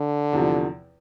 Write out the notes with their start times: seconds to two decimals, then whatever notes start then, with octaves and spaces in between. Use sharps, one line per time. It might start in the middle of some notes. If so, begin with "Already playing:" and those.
Already playing: D3
0.33 E2 C3 F3